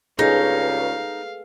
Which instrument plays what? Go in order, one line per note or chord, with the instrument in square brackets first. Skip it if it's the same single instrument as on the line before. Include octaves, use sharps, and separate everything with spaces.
[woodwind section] C#2 G2 C#3 [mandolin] D#4 [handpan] G#4 A4 B4 [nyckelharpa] F5